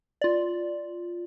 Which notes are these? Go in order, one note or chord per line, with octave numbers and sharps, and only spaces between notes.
F4 D5